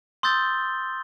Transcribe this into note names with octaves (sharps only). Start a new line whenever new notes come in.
C6 D#6 E6 G6 A6 G7